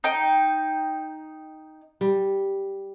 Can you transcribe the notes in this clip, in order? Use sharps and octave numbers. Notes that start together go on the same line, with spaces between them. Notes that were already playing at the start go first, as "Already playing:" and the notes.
D#4 G5
G3